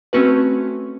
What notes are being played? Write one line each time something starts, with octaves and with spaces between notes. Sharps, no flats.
A3 C4 C#4 F#4 B4